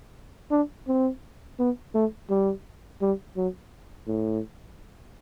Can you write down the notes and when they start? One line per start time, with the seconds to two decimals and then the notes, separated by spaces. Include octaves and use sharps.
0.51 D4
0.87 C4
1.59 B3
1.94 A3
2.30 G3
3.01 G3
3.36 F#3
4.07 A2